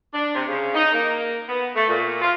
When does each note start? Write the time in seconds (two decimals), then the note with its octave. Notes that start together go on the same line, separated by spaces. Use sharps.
0.13 D4
0.35 C3
0.48 C#3
0.75 D#4
0.92 A#3
1.48 B3
1.75 A3
1.88 A#2
2.22 F4